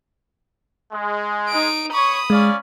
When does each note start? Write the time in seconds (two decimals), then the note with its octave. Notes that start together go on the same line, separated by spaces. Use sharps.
0.91 G#3
1.49 D#4 D7
1.93 C#5 B5 C#6 D#6
2.30 G#3 C#4 D5 F5